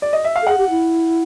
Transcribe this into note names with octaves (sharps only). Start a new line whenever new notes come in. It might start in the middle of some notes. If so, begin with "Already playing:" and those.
D5
D#5
E5
F5
A4
G#4 F#5
G4
E4